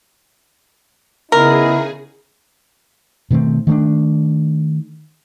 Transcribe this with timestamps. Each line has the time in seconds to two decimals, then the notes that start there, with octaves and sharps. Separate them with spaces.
1.32 C#3 B3 D#4 E4 G#4 A#4
3.31 B2 D#3 A3 C4
3.67 D#3 A3 B3 D4